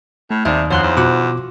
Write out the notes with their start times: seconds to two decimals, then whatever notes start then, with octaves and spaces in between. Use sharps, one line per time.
0.31 A2 A3
0.45 D#2 C3 D5 E5
0.70 F2 B2 C#5 C6 F#6
0.83 E2
0.97 B2 F4 F#4 D6